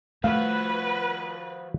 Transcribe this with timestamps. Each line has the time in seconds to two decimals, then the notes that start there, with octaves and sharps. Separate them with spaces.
0.24 F3 A3 F#4 B4 F5